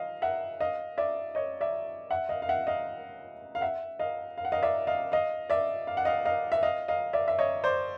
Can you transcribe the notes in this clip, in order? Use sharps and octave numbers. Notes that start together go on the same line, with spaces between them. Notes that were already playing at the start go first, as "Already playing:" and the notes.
Already playing: D#5 F5
E5 F#5
D#5 F5
D5 E5
C#5 D#5
D5 E5
E5 F#5
D#5 F5
F5
E5 F#5
D#5 F5
F5
E5 F#5
D#5 F5
F5
F#5
D#5 F5
D5 E5
D#5 F5
D#5 F5
D5 E5
F5
F#5
D#5 F5
D#5 F5
E5
D#5 F5
D#5 F5
D5 E5
E5
C#5 D#5
C5 D5